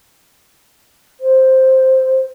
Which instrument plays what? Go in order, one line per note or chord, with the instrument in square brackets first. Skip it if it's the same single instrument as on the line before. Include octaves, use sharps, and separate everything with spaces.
[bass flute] C5